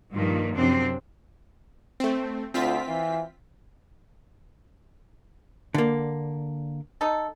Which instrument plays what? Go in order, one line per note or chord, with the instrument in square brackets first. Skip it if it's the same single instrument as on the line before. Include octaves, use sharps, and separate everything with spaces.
[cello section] G2 A#2 D#3 F3
F#2 C3 F3 C4 D4
[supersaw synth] A3 C4
[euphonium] D2 [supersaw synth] C4 F4 B6
[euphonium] E3
[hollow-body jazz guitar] D3 A#3 [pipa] D5
[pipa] D#4 A4